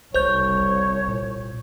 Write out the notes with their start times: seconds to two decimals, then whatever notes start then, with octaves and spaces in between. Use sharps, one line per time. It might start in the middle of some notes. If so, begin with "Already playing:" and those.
0.14 F#1 C2 C5 C#5 G6
1.08 A#2